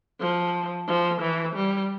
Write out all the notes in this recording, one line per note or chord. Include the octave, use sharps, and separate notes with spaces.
F3
F3
E3
G3